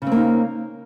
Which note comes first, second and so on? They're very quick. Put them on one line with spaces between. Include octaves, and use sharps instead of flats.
C#3 C4 A#3 D#4